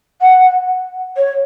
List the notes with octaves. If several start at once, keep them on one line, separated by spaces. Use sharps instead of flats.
F#5
C#5